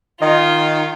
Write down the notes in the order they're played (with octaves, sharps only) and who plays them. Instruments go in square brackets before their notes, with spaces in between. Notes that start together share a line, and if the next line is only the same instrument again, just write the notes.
[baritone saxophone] D#3 [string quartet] F4 [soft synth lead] D#5